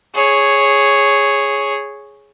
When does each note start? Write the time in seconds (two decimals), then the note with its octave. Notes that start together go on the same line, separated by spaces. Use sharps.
0.15 G#4 C#5